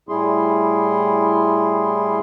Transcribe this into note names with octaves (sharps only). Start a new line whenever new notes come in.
A2 G3 E4 G#4 C6